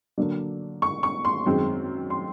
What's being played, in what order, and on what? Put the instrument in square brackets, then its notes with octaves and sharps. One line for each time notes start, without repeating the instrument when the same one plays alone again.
[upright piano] D3 F#3 A#3 D4
C#6
C#6
C6
F#2 D#3 G#3 C4
C6